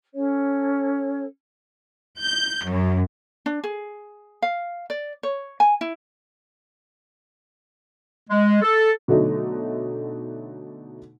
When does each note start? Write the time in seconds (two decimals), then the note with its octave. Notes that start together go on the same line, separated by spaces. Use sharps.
0.14 C#4 A4 C#5
2.19 G6
2.65 F#2
3.46 D4
3.64 G#4
4.42 F5
4.90 D5
5.23 C#5
5.60 G#5
5.81 E4
8.29 G#3
8.62 A4
9.08 B2 D3 F#3 A3 D#4